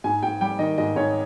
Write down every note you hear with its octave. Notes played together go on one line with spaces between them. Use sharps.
G#2 G#5
G#2 G5
G3 G5
D#3 D#5
G#2 D#5
G#2 C#5